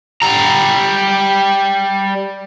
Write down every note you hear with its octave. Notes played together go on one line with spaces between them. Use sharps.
G3 A#5